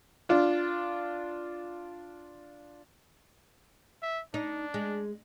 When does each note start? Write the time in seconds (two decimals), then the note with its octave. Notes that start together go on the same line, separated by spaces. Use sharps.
0.29 D4 F4
4.02 E5
4.34 D4 D#4
4.74 G#3